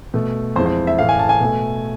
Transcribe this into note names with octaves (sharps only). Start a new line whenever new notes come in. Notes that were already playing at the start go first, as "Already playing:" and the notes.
B2 A3
F2 E3 G#3 C5
C5
E5
A2 E3 A3 F5
G#5
A5
G#5
B2 A3